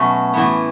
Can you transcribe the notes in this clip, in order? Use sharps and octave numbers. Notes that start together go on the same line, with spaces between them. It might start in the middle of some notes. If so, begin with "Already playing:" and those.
Already playing: B2 F#3 A3 C#4
A2 E3 B3